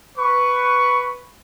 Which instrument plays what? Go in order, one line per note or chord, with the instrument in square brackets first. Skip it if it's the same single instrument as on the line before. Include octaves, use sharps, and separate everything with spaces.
[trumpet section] B4 C#6